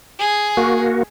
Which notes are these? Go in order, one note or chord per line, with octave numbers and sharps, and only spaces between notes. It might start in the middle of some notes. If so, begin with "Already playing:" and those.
G#4
A#3 F#4